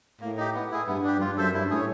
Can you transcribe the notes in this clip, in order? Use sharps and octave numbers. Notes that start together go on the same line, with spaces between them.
A2 A#3
D#4 G4
B3
E4 G#4
G2 B3
D4 G4
F#2
G2 F4
F#2 A4 C5 E5
G2 E4
A2 G#4 C#5